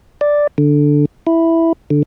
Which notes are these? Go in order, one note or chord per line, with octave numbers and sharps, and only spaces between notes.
D5
D3
E4
D3